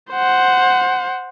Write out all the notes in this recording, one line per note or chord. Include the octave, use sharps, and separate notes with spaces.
C5 F#5